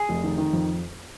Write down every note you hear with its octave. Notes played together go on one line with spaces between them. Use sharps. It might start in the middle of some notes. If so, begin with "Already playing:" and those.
Already playing: G#4
F1
D#3
D#3
F2